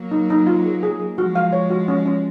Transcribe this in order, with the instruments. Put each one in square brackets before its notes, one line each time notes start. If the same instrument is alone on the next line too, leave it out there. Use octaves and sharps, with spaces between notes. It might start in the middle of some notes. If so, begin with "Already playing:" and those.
Already playing: [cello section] F#3 A#3
[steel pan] D#4
D#4
F4
G#4
G#4
G#4
[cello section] F3 G#3 [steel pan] F#4
[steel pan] F5
C#5
F#4
C#4
C#4